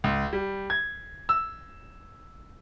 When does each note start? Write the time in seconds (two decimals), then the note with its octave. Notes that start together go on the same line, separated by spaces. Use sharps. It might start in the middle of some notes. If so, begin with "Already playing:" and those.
0.04 C#2
0.33 G3
0.70 G#6
1.29 E6